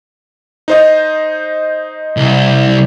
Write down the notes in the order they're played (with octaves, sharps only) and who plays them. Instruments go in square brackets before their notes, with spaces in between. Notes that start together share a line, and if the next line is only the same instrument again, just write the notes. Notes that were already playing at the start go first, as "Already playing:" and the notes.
[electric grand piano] D#4 C5 D#5
[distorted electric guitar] C2